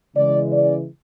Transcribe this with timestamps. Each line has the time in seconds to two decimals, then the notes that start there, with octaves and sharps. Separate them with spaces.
0.16 C#3 E3 G#3 D5
0.51 D5